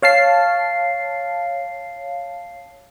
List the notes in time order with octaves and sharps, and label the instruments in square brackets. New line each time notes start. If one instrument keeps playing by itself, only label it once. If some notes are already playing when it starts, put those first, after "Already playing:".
[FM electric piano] C#5 F5 A5 C7